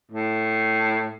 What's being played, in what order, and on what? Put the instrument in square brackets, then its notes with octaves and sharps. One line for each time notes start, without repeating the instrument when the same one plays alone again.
[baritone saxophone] A2